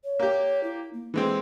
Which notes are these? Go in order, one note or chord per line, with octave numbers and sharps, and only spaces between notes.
C#5
A#3 G4
E4
A#3
E3 G#3 C4